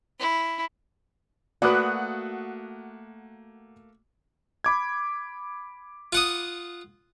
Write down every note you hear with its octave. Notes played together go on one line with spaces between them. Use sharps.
E4
A3 A#3 F#4 B4 D5 F#5 D#6 F#6
B5 D6 G#6
F4 F#5 D#6